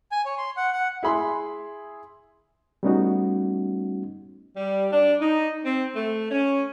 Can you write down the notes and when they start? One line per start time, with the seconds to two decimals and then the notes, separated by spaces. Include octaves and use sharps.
0.12 G#5
0.25 C#5
0.38 C6
0.57 F#5
0.73 F#5
1.03 E4 G#4 B5 C6
2.83 G3 A3 B3 C#4 D#4 F#4
4.57 G3
4.91 D4
5.20 D#4
5.64 C4
5.95 A3
6.31 C#4